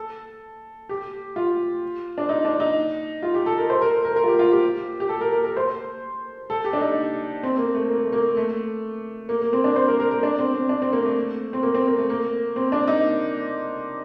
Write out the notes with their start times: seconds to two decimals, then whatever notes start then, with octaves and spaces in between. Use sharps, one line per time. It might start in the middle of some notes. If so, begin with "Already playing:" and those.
Already playing: A4
0.89 G4
1.36 F4
2.18 D4
2.29 D#4
2.45 D4
2.60 D#4
3.23 F4
3.34 G4
3.46 A4
3.58 A#4
3.70 C5
3.81 A#4
4.05 A#4
4.16 A#4
4.24 F4
4.28 G4
4.39 F4
4.51 G4
5.00 G4
5.09 A4
5.21 A#4
5.33 A#4
5.44 A#4
5.57 C5
6.50 A4
6.65 G4
6.73 D4
6.81 D#4
7.43 C4
7.58 A#3
7.74 A3
7.90 A#3
8.05 A3
8.12 A#3
8.37 A3
9.29 A#3
9.42 A#3
9.53 C4
9.64 D4
9.76 C5
9.88 A#4
10.00 A#4
10.11 A#4
10.23 D4
10.39 C4
10.54 C4
10.69 D4
10.82 C4
10.93 A#3
11.05 A3
11.53 C4
11.63 A#3
11.74 C4
11.87 A#3
11.98 A3
12.10 A#3
12.56 C4
12.72 D4
12.87 D#4